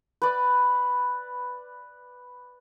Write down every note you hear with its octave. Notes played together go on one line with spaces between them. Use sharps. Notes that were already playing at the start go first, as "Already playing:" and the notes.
B4 D5